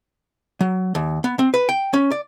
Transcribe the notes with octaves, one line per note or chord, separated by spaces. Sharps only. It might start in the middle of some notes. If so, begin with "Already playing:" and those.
F#3
D#2
B3
C4
B4
G5
C#4
D5